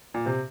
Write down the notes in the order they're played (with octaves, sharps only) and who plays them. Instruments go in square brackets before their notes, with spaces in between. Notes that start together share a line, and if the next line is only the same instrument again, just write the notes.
[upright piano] A#2
C3